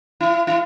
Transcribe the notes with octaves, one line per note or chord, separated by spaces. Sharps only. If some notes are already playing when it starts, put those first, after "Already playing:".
E4
E4